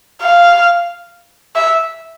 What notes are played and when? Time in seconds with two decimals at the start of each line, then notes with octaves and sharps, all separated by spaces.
0.22 F5
1.55 E5